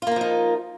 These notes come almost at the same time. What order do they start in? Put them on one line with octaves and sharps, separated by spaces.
F4 A#3 A#4 F3 D#4